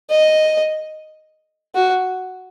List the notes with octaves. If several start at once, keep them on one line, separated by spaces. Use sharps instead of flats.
D#5
F#4